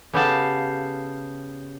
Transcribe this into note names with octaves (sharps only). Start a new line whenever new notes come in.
C#3 B3 G4 A4 F5 A5